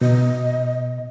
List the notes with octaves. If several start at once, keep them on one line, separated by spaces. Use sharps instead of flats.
B2 D#5